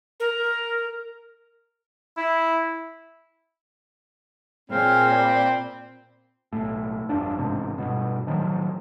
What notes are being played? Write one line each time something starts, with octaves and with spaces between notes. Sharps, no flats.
A#4
E4
A#2 C4 G#4 C#5 F6
D5 B5 D6
B1 A2
G1 F2 D4
A1 G#2 C3
G2 B2
A2 D#3 F3 F#3